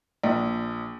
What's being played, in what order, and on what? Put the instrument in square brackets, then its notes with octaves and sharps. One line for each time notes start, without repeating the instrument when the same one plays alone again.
[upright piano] A#1